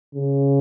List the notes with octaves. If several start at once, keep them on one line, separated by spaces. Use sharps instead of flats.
C#3